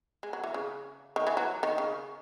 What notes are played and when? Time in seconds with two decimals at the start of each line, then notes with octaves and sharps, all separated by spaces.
0.23 G#3
0.33 F#3
0.44 E3
0.54 C#3
1.16 D#3
1.27 E3
1.37 F#3
1.63 D#3
1.78 C#3